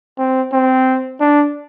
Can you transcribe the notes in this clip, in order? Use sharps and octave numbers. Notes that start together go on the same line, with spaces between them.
C4
C4
D4